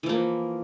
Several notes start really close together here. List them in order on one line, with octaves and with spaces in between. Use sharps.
E3 F3 A#3